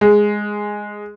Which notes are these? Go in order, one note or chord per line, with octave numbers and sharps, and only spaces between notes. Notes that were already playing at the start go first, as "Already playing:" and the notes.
G#3